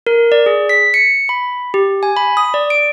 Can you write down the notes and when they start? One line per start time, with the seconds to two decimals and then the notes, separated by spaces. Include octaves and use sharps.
0.07 A#4
0.32 D5
0.46 G#4
0.69 B6
0.94 C#7
1.29 B5
1.74 G4
2.03 G#5
2.17 B5
2.37 D#6
2.54 D5
2.70 D7